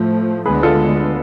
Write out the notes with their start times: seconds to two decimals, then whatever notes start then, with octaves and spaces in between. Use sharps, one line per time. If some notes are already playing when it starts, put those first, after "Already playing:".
Already playing: A2 F3 A3
0.46 D2 D3 G#3 B3 G#4 B4
0.63 F4 A4